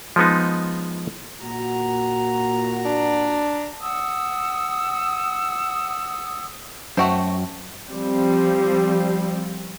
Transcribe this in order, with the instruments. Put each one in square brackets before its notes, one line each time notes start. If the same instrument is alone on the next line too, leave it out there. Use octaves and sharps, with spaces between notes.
[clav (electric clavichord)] F3 G#3 B3 D#4
[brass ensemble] A#2 F#4 [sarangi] A#5
[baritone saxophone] D4
[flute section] F#5 D#6 E6
[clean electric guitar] F#2 G5 [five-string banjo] A3 F#4 C5
[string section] F3 G3 C4